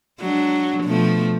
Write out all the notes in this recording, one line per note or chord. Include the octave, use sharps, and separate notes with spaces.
F#3 G#3 D4
B2 F3 A3